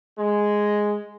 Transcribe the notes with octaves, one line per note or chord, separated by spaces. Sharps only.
G#3